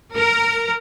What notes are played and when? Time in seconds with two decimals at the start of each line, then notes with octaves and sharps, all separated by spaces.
0.15 A#4